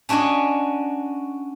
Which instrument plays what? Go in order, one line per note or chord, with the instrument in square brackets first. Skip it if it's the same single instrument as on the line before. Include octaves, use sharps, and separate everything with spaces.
[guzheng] C#4 D4 F#4 C#5 D#5